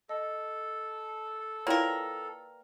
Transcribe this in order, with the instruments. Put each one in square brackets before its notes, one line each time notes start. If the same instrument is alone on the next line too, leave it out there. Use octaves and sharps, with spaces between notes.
[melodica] A4 [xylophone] D#5
[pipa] A#3 A#4 [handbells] E4 F4 C#5 [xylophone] B4 D5 G5